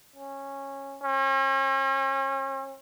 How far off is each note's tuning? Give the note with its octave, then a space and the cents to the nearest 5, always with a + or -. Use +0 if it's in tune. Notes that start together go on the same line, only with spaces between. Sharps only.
C#4 -15
C#4 -40